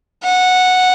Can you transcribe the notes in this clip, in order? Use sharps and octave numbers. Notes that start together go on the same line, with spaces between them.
F#5